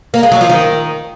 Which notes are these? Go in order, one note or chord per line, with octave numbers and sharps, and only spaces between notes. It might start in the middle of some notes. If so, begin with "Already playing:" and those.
A#3
G#3
F#3
F3
D#3